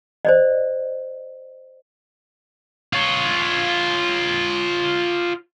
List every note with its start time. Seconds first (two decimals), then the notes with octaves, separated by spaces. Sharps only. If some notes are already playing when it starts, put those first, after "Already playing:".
0.25 C5 D5 D#5
2.93 F4 C#5